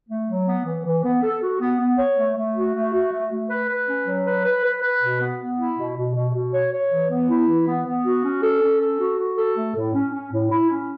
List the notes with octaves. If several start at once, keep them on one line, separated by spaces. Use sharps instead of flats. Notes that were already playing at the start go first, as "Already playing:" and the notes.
A3
F#3
B3
E3
E3
B3
A4
F#4
B3
B3
C#5
A3
A3
F#4
A3
F#4
A3
A3
B4
B4
C#4
F#3
B4
B4
B4
B4
B2
B3
B3
E4
B2
B2
B2
B2
C#5
C#5
E3
B3
E4
E3
B3
B3
F#4
C#4
A4
C#4
A4
F#4
F#4
A4
A3
A2
C#4
C#4
A2
E4
C#4